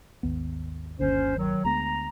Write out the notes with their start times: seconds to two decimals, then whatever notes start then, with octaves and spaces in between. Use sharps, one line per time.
0.23 G#1 D#2 B3
0.99 G1 D#2 D3 C#4 C5
1.37 D#3 F#3
1.65 D2 G#3 B3 A#5